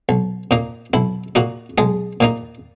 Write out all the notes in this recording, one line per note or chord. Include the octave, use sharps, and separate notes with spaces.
B1
A#2 A#3 D#4
B1 E4
A#2 A#3 D#4 F#4
B1 G#3 G#4
A#2 A#3 D#4